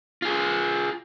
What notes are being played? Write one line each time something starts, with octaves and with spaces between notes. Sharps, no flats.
F4 G#4